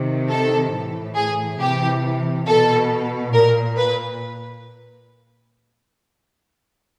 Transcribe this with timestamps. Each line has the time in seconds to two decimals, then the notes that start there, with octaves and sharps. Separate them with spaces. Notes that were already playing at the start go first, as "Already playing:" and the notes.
Already playing: C3 D#3
0.29 A4
0.73 A2 E3
1.16 G#4
1.59 C3 E3 G4
2.46 B2 A4
3.33 A#2 A#4
3.77 B4